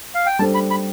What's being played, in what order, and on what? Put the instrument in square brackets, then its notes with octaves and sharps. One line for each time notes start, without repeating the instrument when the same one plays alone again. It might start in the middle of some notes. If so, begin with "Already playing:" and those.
[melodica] F5
G5
[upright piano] G3 D4 A4 C5 [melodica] A5
[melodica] B5
B5